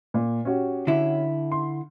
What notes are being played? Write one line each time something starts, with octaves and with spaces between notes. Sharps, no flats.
A#2
C#4 F#4 G4
D3 E4
C6